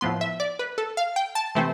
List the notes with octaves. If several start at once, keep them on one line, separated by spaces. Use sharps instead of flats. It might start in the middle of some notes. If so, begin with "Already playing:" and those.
A2 F3 B3 C6
E5
D5
B4
A4
F5
G5
A5
C3 E3 A3 C4